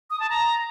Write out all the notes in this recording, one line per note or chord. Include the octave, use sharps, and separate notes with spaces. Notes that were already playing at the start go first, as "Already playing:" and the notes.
D#6
A5
A#5